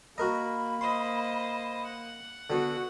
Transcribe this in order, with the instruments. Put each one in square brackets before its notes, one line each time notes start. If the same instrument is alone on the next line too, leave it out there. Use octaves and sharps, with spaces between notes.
[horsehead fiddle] A#3 [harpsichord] F#4 A#4 D#5 [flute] B5
[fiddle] C5 D#5 [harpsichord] C6
[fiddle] F#5
[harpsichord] D3 B3 [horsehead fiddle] F#4